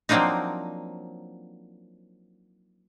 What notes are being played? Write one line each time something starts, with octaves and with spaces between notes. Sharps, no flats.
F3 F#3 A#3 C4 D4 D#4